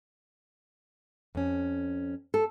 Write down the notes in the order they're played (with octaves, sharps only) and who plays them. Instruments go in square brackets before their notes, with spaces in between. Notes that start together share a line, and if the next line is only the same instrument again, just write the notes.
[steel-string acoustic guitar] F2 C#4
[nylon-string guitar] A4